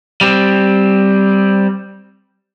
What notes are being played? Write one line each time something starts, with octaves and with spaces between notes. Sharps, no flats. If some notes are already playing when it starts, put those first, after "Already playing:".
G3 C4